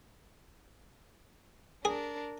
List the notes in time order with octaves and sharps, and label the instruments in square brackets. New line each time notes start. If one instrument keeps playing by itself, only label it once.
[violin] D4 A#4 [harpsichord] G#4